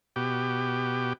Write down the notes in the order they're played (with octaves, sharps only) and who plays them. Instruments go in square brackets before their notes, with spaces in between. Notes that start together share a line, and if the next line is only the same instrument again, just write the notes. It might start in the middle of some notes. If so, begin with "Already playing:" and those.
[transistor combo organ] B2 G4